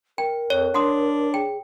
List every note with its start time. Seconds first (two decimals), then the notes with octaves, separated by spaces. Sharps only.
0.18 A#4 G5
0.50 F2 C#5
0.74 D4 F#5 C6 D#6
1.34 G#4 G5